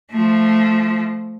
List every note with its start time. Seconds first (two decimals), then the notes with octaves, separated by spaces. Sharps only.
0.11 F3 A3